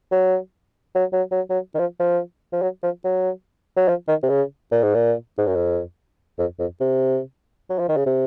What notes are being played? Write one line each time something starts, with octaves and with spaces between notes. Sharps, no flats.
F#3
F#3
F#3
F#3
F#3
D#3
F3
F3
F3
F#3
F3
F#3
F#3
F3
D#3
C3
C#3
A#2
G#2
A#2
G#2
F#2
F2
F2
F2
C3
F#3
F3
D#3
C#3
C3